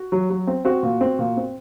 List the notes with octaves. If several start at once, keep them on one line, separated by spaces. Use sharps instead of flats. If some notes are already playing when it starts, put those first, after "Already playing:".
Already playing: F#4
F#3
F#3
C4
C4 F#4
A#2
C4
A#2
C4